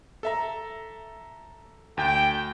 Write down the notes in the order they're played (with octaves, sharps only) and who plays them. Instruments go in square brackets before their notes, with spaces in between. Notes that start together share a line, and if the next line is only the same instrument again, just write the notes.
[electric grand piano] A4 E5 A#5
[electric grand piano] D2 [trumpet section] G5